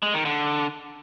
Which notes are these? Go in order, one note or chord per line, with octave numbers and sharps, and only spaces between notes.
G#3
D#3
D3